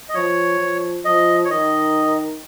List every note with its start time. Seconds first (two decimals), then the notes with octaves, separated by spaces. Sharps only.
0.09 D#5
0.14 F3 C#5
0.59 F3
1.05 F3 D#5
1.45 C#5
1.50 D#3 D#5